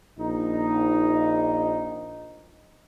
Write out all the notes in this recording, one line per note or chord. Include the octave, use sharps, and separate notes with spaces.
A#1 D#4